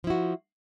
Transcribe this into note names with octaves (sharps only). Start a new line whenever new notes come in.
F3 E4 F#4